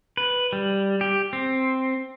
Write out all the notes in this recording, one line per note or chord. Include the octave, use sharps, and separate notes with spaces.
B4
G3
G4
C4